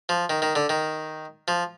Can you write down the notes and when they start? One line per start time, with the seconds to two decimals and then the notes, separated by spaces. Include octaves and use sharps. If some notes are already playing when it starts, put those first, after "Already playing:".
0.09 F3
0.30 D#3
0.42 D#3
0.55 D3
0.69 D#3
1.48 F3